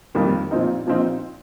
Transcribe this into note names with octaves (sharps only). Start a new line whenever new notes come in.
F2 D#3 G3 A#3
A#2 F3 C4 D#4
A#2 F3 C4 D#4